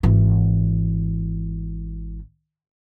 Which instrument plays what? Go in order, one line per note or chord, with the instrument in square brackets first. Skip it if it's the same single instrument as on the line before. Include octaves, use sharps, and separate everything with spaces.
[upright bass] G#1 E3